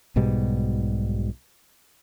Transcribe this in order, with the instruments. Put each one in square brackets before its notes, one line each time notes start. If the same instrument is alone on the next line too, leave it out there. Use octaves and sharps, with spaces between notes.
[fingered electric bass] B1 G#2 B2 G3